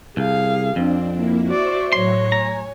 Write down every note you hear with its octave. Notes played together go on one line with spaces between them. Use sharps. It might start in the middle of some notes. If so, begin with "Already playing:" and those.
C2 G#4 F5
F2 C4 D4
A#3 E4
F#4 C5 D5 E5 C#6
A2 F#3 C#5 C6 A#6
G#5 A#5